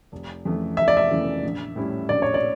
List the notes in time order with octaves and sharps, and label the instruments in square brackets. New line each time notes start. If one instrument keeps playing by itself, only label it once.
[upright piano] F1
F2 C#3 E3 A3
[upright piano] F1 [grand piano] E5
[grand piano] D5
E5
[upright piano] F2 C#3 E3 A3
A#1
A2 G3 C#4 E4
[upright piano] A#1 [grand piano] D5
[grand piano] C#5
D5